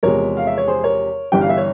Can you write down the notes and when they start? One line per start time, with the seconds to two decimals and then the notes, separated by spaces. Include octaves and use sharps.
0.03 E2 C3 F3 G#3 A#4 C#5
0.37 F5
0.47 E5
0.58 C#5
0.67 G#4 C5
0.84 A#4 C#5
1.32 G1 G2 E3 G3 G5
1.41 F5
1.49 E5
1.57 C#5